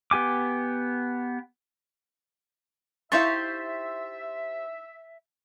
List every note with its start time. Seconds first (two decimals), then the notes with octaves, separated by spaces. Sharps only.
0.11 B3 G4 G#5 D6
3.12 D#4 E4 G4 C5 E5 F5 C#6 A6